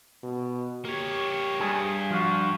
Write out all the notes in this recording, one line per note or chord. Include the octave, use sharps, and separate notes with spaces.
B2
A#3 G4 C#5
G2 G#4
F3 F4 F#4